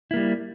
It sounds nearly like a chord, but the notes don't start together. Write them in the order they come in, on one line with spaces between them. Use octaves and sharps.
E4 A#3 G3